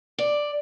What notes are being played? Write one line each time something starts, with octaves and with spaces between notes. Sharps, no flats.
D5